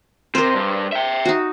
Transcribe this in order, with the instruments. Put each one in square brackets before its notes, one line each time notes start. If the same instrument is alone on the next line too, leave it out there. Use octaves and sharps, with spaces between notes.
[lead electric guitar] C3 [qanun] A#4 C5
[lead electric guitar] G2
E5 G5
[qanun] D#4 F#4